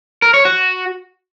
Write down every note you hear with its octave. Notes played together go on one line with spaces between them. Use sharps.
A#4
C#5
F#4